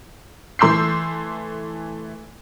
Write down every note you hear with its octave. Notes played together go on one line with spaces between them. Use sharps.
E3 A3 C6 E6 G6 C7